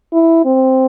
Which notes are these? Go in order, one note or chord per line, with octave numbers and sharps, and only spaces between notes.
E4
C4